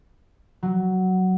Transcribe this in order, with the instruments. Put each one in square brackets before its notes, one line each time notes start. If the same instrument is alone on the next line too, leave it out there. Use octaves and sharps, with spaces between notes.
[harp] F#3